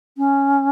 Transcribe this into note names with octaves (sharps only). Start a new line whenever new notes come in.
C#4